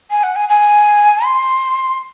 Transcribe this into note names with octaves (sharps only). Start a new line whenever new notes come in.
G#5
F#5
G#5
G#5
C6